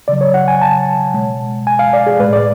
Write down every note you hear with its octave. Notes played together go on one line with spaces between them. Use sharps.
C#3 F#3 D5
C#5
F#5
G#5
A5
B2 G#3
G#5
F5
D5
G#4
A2 G#3 B4
D5